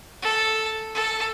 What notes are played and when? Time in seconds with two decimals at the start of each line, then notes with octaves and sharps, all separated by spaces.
0.22 A4
0.95 A4